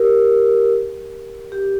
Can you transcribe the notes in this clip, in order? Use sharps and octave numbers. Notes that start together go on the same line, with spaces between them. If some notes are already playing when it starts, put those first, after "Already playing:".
Already playing: G4 A#4
G4